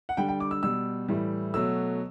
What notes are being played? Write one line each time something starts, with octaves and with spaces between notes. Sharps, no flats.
F#5
D3 G3 G5
G5
D6
E6
B2 G3 E6
A2 E3 G3
B2 F#3 A3 E6